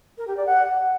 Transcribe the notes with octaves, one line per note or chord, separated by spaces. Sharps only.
A#4
G4
D5
F#5